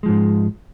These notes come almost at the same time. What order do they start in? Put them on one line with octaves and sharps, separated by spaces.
G#3 F3 G#2